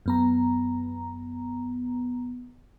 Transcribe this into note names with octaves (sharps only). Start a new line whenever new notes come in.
F#2 B3 A#5